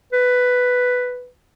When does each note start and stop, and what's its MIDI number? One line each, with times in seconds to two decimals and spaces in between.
0.13 1.28 71